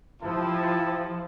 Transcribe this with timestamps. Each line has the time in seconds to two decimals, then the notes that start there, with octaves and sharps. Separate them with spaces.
0.22 F3 E4 G4 A5